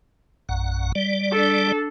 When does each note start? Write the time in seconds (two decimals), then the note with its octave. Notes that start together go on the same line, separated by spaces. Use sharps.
0.49 A#1 F#2 F#5
0.95 G3 D5
1.32 D4 A4